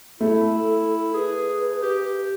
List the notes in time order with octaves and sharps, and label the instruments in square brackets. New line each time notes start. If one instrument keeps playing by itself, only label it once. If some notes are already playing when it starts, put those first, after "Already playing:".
[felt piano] A3 [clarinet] E4 [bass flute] A4
[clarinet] G#4 [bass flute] B4
[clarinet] G4